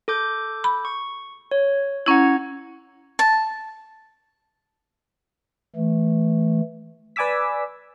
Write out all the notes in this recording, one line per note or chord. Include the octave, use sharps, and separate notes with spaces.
A4 D6 G6
B5
C#6
C#5
C#4 E4 F#5 A#5 G#6
A5
E3 A3
B4 D5 G#5 D6 E6 B6